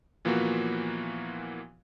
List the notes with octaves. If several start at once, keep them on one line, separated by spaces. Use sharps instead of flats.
A#2 E3 F3 A#3 B3 F#4